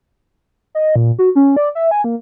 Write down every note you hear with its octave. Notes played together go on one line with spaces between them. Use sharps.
D#5
A#2
F#4
C#4
D5
E5
G#5
A#3